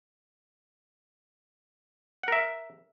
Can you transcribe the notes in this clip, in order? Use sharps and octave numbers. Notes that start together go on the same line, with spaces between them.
A#4 E5 F#5